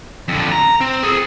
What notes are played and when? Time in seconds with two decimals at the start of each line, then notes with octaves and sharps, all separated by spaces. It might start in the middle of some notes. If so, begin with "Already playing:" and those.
0.28 F2 D3
0.52 A#5
0.81 C4
1.03 G#4 A4